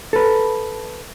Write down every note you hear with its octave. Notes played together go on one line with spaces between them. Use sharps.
A4 B4